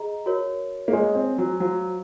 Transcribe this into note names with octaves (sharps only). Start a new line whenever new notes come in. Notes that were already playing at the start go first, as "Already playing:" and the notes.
Already playing: G#4 D#5 A#5
F#4 A#4 C#5
A#3
G#3 C#5 G#5 C6
C4
F#3
F#3 F#4 C5 F5